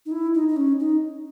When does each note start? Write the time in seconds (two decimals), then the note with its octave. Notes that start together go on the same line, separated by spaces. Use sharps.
0.06 D#4
0.12 E4
0.34 D#4
0.49 D#4
0.56 C#4
0.80 D#4